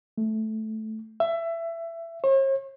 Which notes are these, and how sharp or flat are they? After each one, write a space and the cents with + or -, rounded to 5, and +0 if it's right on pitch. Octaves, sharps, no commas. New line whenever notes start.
A3 -10
E5 +20
C#5 -45